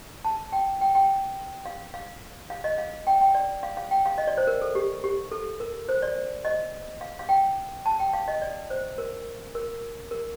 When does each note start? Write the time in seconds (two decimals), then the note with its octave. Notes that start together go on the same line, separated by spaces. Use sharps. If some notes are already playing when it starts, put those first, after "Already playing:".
0.25 A5
0.52 G5
0.81 G5
0.95 G5
1.66 F5
1.94 F5
2.50 F5
2.64 D#5
2.78 F5
3.07 G5
3.21 G5
3.34 D5
3.63 F5
3.77 F5
3.91 G5
4.06 F5
4.18 D#5
4.27 D5
4.37 C5
4.47 A#4
4.62 A4
4.75 G4
5.04 G4
5.31 A4
5.60 A#4
5.89 C5
6.02 D5
6.45 D#5
7.01 F5
7.19 F5
7.29 G5
7.86 A5
8.00 G5
8.13 F5
8.28 D#5
8.42 D5
8.70 C5
8.98 A#4
9.55 A#4
10.11 A#4